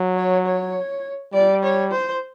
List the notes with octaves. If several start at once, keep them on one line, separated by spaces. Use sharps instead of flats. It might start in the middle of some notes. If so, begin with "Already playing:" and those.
Already playing: F#3
C#5
C#5
G3 D5
C#5
C5